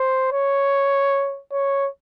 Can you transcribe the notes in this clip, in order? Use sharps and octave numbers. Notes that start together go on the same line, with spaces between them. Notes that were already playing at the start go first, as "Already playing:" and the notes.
Already playing: C5
C#5
C#5